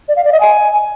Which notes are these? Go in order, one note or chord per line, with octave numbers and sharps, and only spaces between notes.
D5
F5
D5
D#5
G#5